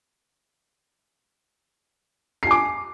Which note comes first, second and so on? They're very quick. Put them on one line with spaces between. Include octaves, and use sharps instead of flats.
C7 G#5 D6